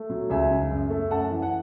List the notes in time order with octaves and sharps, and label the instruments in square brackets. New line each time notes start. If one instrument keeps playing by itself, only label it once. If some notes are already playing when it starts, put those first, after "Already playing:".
Already playing: [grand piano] A3
F#3
C#2 E5 G#5
C#3
F#2
A3
F#2 F#5 A5
E3
F#5